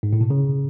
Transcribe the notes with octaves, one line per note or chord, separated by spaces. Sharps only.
G#2
A2
B2
C#3